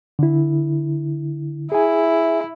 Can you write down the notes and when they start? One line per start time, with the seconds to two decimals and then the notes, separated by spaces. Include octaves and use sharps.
0.19 D3 E4
1.72 E4 G#4 G#5